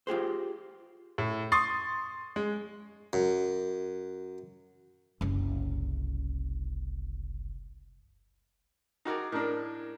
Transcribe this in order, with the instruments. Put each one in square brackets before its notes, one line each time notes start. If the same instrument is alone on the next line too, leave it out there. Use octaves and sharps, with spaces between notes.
[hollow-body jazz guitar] F4 G4 G#4 C5
[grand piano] A2
C6 C#6 D#6 A6 C7
G#3
[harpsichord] F#2
[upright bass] F#1 C2
[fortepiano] D#4 F#4 A#4 [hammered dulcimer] G#4 D5 A#5
[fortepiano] A2 D4 [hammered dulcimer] A#4 D#5